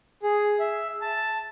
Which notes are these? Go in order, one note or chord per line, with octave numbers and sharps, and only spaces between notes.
G#4
E5
A5